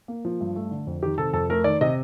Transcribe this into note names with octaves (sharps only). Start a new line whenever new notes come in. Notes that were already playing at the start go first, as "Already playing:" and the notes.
A#3
F3
G2
A3
D3
F2
D#3 G4
C3 A4
F2 A4
A3 A#4
D#3 D5
C3 D#5